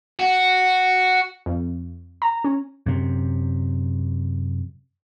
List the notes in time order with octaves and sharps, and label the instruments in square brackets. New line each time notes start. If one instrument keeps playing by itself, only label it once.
[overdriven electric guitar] F#4
[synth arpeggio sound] F2
A#5
C#4
[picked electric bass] F#2 C3